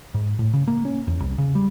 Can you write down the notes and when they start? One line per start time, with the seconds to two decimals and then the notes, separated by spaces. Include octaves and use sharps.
0.14 G#2
0.39 A2
0.53 C#3
0.68 A#3
0.85 C#4
1.07 E2
1.20 C2
1.38 C#3
1.55 G3